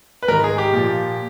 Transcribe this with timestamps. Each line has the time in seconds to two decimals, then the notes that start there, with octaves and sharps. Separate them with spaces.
0.23 B4
0.28 G#2 D#3 A#4
0.44 G#4
0.58 G4
0.73 A#2 F3